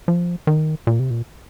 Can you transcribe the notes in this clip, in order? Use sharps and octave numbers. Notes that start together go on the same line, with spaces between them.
F3
D#3
A#2
C3
A#2